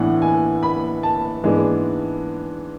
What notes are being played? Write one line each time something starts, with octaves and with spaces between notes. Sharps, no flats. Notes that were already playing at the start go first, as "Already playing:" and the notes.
Already playing: A2 E3 B3 D4 F#5
G#5
B5
A5
G#2 E3 G#3 B3 D4